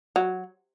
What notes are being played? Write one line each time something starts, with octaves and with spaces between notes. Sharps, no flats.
F#3